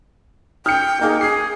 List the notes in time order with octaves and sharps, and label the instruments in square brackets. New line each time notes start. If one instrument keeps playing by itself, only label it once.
[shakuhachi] G5 [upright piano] F6 C#7
[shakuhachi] A#3 [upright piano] D#4 G#4
[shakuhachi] G#4 [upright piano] C7